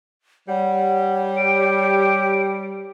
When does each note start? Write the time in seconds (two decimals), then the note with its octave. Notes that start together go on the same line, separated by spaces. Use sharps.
0.48 G3 C#5 F#5
1.37 G4 D7